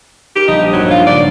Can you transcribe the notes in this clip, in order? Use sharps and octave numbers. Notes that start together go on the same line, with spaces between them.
D#4 G4 A#4
A#1 G3 D#4
G2 F#3
F4
F#1 D5